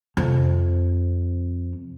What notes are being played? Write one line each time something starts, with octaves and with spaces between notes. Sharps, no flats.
F2 C3